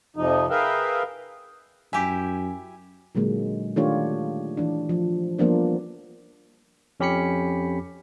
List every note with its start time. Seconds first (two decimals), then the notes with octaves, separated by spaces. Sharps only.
0.16 F2 C3 F3 D#4
0.50 G#4 A#4 B4 E5 F5 G5
1.93 F#2 E4 G4 G#5
3.15 A#2 D3 F#3 G#3 A#3
3.76 D#3 A3 D4 F4 G4 C#5
4.57 E3 D4
4.89 F3
5.39 F3 G3 A#3 B3 D4 C5
7.00 F2 C#4 G4 B5 B6 C#7